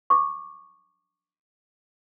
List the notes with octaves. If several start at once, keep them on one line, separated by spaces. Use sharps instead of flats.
C#6 D6